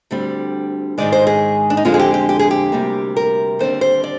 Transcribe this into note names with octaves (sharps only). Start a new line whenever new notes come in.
D2 D3 G3 C4
G#2 D#3 G#3 D5
C5
G#4
D4
D#4
F2 D3 G#3 C4 F4
G#4
G4
G4
G4
G#4
G4
D2 C3 G3 A#3
A#4
D#2 D3 G3 C4 C5
C5
D5